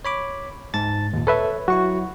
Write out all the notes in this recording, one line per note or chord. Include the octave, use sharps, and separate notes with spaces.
C#5 B5 D6
G#2 A5 A6
D#2 A#2
A4 B4 C#5 E5
F#3 E4 F#4 C#6